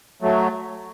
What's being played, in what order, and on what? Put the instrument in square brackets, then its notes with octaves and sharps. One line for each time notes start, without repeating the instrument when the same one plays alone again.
[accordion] F#3 A3